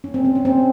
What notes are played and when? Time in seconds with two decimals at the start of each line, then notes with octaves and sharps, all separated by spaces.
0.04 C#4
0.14 C4
0.25 C4
0.35 C#4
0.45 C4